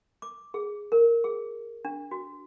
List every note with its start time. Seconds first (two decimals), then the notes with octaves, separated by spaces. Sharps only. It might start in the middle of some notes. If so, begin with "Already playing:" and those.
0.22 D6
0.54 G#4
0.92 A#4
1.24 G#4
1.85 D4
2.11 F#4